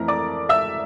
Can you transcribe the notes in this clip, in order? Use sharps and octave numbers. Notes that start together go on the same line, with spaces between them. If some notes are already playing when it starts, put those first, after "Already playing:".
Already playing: F2 E3 A3 A#4 A#5
D5 D6
E5 E6